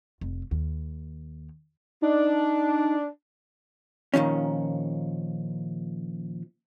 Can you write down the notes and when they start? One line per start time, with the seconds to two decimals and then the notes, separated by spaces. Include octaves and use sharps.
0.21 F1
0.51 D#2
2.02 D4 D#4
4.14 A#2 D#3 F3 C#4